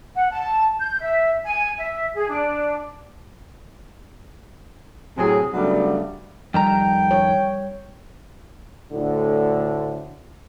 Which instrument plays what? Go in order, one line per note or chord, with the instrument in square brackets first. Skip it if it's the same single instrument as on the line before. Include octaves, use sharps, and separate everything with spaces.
[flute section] F#5
A5
G6
E5
G#5
E5
G#4
D4
[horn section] A2 C3 F#3 G#4
C#3 F#3 G3 A3 B3 D4
[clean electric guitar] F2 D#3 A#5 [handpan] G3 [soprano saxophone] G5
[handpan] C#5
[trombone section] D2 A2 D3